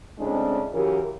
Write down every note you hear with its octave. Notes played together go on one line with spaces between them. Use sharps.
A2 C#3 G#3 C4 D4
C#3 E3 F#3 G4 A#4